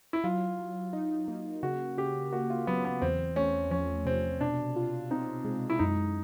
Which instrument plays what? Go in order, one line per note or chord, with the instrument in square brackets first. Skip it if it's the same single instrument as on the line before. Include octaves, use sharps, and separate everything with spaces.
[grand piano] E4
[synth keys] F#3 [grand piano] F4
[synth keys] F#3
D#4
A#3
[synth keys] C#3 [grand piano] F#4
[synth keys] C#3 [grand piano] G4
[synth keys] A#3 [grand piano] F#4
[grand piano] F4
[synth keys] F#3 [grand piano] B3
[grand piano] B3
[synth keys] E2 [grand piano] C4
[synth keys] A3 [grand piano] C#4
[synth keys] F3 [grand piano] C#4
[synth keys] C3 [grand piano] C4
[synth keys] B2 [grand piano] D4
[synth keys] F4
[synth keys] C4 [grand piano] D#4
[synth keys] G#3
[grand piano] E4
[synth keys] F#2 [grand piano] D#4